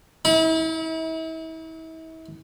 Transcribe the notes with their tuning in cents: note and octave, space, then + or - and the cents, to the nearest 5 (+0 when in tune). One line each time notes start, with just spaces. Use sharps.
E4 -40